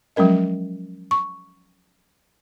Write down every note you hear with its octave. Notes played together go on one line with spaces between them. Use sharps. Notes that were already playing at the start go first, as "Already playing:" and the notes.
F3 F#3 G#3 C#4 A#4 D#5
C#6